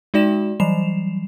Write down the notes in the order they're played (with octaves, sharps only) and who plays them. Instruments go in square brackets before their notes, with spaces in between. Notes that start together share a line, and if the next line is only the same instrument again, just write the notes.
[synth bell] G#3 D#4 F#4 D5 G5 E7
E3 F#3 G3 C7 E7 F7